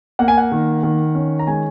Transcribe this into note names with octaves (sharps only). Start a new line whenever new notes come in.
A#3 F#5
G#5
F#5
D#3
D#3
C#4
A#5
G#3 G#5